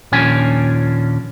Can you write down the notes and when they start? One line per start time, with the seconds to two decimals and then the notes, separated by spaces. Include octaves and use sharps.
0.12 D#2 A#2 F3 C#4 D4 G#5